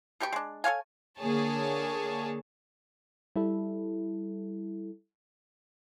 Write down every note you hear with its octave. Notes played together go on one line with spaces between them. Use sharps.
B2 G4 G5 C#6
G#3 D4
A4 C#5 F5 G#5
D3 A#3 G#4 C#5 A5
G3 E4 A4